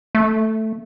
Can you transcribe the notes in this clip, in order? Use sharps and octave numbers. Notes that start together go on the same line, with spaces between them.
A3